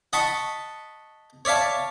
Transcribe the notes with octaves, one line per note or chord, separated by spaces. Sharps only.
D#5 F#5 A5 B5 C#6
C#5 D5 E5 F5 A5